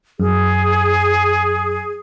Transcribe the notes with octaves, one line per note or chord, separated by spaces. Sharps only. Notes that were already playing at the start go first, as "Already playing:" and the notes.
F#2 G#4